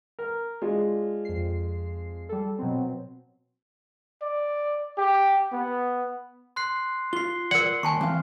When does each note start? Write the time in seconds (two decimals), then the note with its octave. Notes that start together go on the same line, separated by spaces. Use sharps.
0.19 A#4
0.62 G#3 D4 F4
1.25 F2 C7
2.29 G3 A4
2.59 B2 F#3 C4
4.22 D5
4.98 G4
5.53 B3
6.56 C6 F#6 C7
7.13 F4 C7 G7
7.51 A#4 D5 F#5
7.83 D#2 G#5 A5 C#6
8.01 E3 C4 F5